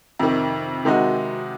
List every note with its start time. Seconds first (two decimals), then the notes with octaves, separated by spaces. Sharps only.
0.19 F2 C3 D#3
0.85 C3 D#3 G#3 D#4 F#4